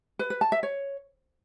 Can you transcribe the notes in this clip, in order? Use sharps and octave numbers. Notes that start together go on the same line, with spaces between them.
B4
B4
A5
E5
C#5